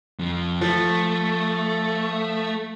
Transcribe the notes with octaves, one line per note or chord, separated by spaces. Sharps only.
F2 F3
F3 A3